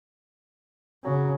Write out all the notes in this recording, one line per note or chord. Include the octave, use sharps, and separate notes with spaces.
C#3 F#3